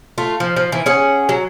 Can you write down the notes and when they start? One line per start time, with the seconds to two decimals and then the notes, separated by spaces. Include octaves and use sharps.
0.18 A3 F4
0.40 F3
0.56 F3
0.72 E3
0.86 C#4 G#4 F#5
1.29 F#3